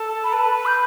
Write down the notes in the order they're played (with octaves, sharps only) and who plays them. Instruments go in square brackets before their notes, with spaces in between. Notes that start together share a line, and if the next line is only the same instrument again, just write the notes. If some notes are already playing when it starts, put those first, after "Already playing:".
Already playing: [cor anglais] A4
[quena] B5
[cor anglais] B4 [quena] A5
[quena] B5
G6